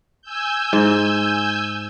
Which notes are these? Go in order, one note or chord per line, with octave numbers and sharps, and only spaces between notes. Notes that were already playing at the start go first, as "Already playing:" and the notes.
G#5 E6 G6
G#2